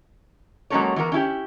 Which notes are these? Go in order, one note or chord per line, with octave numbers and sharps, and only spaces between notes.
F#3 G#3 A#3 C#4 A4 C#5
E3 B3 F#4 A#4
C#4 E4 G4